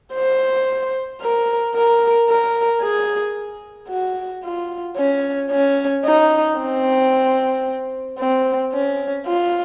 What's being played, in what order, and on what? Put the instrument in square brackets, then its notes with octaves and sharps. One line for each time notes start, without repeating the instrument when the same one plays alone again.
[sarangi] C5
A#4
A#4
A#4
G#4
F#4
F4
C#4
C#4
D#4
C4
C4
C#4
F4